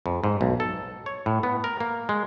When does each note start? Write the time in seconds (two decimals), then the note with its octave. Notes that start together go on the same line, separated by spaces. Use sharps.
0.06 F2
0.24 G#2
0.41 B1
0.60 A4
1.06 C#5
1.26 A2
1.43 B3
1.64 A#4
1.80 A#3
2.09 G#3